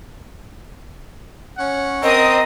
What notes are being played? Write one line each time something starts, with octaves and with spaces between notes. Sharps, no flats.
C#4 F#5
C4 A#4 D#5 D#6